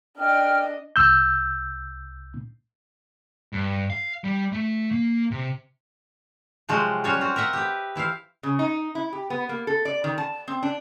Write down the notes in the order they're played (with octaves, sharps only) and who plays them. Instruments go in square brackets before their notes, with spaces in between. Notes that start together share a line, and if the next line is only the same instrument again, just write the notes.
[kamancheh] D4 D#5 [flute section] G5 F6
[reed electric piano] C2 E6 G6
[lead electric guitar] G2
F5
G3
A3
A#3
C3
[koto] C3 F3 F#3 G#3 C4 F#4
F#3 G3 C#4 F4 F#4 C#5
C4 F4 F#4
A#4 D#5 E5 F#5
G4 B4
E3 E4 C5 F5
[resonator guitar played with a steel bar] C#3
D#4
E4
G4
B3
A#3
A4
D5
D#3
A5
C4
D4